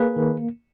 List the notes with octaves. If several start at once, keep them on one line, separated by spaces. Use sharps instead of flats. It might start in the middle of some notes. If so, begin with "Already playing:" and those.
Already playing: A#3 G#4 B4
D#3